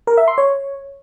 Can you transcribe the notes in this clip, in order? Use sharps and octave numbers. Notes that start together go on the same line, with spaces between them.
A#4
E5
C6
C#5